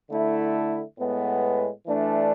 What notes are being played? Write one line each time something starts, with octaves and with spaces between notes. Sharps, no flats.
D3 A3 E4
A2 G#3 B3
E3 A3 D4